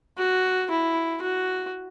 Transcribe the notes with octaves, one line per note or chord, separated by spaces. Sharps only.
F#4
E4
F#4